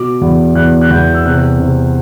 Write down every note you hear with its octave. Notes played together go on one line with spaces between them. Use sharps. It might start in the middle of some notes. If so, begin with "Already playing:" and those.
Already playing: B2 D6
E2
E2 F#6
F#6
E2 G6
E6
C3 F#6
C3